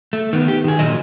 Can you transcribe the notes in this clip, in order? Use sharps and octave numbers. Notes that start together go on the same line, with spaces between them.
A3
D#3 B3
G4
D#3 G#4
A#2 D3 D#3 F#3 D#5